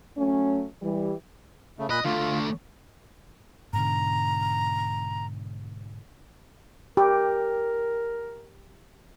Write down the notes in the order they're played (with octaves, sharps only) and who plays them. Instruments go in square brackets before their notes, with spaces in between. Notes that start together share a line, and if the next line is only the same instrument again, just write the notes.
[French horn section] F#3 A3 C#4
E3 G3
[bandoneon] C#3 A3
[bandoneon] A#2 B5 F#6 [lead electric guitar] D#5
[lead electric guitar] D3 A3 [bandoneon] F4
[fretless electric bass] G#2 B2 D3 [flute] A#5
[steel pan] G4 [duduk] A#4